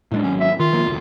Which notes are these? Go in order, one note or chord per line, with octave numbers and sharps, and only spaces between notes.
A2 G#3 D4
G#1 F#3 C#4
E5
D#3 F4
D#3 F3 A#3
F1 D2